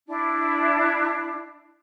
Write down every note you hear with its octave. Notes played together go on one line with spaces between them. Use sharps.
D4 E4